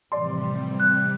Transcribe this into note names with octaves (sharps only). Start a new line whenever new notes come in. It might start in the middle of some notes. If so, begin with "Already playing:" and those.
A2 C3 E3 F3 G3 D5 C6
F#6